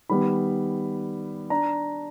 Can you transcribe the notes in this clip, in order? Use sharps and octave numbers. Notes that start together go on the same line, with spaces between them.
D#3 G3 B3 B5
D4 A#5